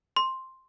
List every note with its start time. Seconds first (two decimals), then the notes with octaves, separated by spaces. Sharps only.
0.17 C6